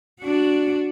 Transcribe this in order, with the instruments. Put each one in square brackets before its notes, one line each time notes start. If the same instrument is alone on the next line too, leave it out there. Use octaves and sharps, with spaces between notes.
[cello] D4 F#4